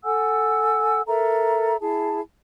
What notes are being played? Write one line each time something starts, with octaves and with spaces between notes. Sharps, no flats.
A4 F#5 G#5 E6
A4 A#4 E5 A#5
E4 G#4 A5